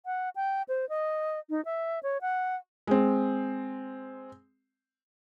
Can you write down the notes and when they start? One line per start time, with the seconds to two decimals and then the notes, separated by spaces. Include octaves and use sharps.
0.06 F#5
0.36 G5
0.68 C5
0.89 D#5
1.50 D#4
1.65 E5
2.03 C#5
2.21 F#5
2.87 G#3 C4